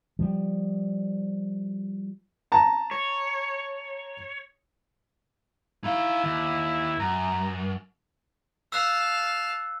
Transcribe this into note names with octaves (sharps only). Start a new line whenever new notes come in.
F3 G3
A5 A#5
C#5
D#4 E4 F5
D#2
F#2 A#5
F5 A5 E6 F#6